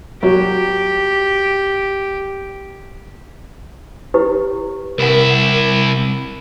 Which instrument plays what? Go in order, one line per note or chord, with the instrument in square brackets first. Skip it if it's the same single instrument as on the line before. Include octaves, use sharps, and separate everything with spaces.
[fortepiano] F#3 [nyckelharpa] G4
[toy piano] E4 G4 B4
[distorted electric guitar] C2 E4 [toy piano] A#4 F#5